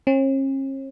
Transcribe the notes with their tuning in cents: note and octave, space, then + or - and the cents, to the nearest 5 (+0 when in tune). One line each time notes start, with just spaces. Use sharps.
C#4 -45